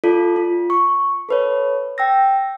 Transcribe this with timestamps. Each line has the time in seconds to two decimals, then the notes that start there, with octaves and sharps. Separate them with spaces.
0.04 F4 A4 D5
0.36 F4
0.70 C#6
1.29 A4 B4 C#5
1.98 G5 E6 A#6